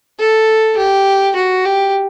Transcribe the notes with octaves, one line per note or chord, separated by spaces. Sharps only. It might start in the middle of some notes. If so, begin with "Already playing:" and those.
A4
G4
F#4
G4